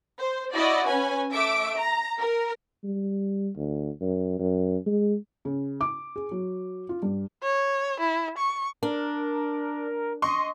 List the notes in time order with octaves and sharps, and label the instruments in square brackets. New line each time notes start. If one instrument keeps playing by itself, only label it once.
[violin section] C5
E4 F#4 D5 D#5
C#4 B4 G#5
A3 E5 D6 D7
A#5
A#4
[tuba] G3
D2
F#2
F#2
G#3
[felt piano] C#3
D6
G#4
F#3
F4
G2
[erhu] C#5
E4
C#6
[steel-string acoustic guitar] D4 [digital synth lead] A#4
[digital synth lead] D#5 [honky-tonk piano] C6 C#6